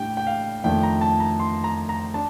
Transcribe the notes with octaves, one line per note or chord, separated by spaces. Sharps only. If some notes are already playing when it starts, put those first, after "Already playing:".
Already playing: A2 G3 D4 G5
G5
F5
F2 D#3 A3 D4 G5
A#5
A5
A#5
C6
A#5
A#5
D4 A5